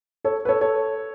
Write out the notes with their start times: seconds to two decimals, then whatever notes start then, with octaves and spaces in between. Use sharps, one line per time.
0.25 A4 C#5
0.45 B4
0.49 A4 C#5
0.61 A4 C#5